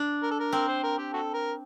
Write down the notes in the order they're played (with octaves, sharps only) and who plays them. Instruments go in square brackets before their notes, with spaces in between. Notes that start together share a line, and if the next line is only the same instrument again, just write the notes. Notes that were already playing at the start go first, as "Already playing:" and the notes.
Already playing: [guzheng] D4
[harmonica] A#4
A4
A#4
[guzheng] C4 [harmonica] A#4
[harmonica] C5
A#4
G4
F#4 A4
A#4